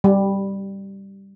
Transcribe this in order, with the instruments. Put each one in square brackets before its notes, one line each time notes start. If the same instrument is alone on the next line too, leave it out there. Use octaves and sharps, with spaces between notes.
[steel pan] G3